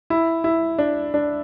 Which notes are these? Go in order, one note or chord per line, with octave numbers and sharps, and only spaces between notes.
E4
E4
D4
D4